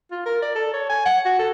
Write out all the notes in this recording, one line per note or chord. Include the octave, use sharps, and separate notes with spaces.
F4
A#4
D5
A4
C#5
G#5
F#5
F#4
A4